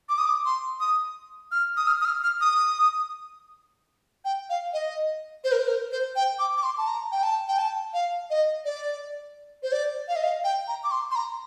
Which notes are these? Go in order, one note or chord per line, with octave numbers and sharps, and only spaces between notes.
D6
D#6
D6
C6
D#6
F6
D#6
F6
D#6
F6
F6
D#6
G5
F5
D#5
C5
A#4
C5
A#4
C5
G5
D6
D6
C6
A5
A#5
G5
A5
G5
A5
F5
D#5
D5
C5
D5
F5
D#5
F5
G5
A#5
D6
C6
C6
A#5